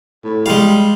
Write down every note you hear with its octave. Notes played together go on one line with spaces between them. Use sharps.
A2
G3 G#3 F5